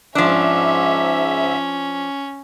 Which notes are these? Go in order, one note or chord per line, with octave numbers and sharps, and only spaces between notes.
G#2 F3 C#4 D4 E5